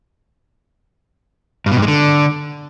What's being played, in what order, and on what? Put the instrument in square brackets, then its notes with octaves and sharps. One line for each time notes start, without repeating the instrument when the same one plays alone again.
[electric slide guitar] G2
B2
G2
G#3
D3